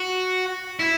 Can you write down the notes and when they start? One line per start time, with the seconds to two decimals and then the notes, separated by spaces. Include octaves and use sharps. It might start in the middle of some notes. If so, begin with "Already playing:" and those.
Already playing: F#4
0.80 E4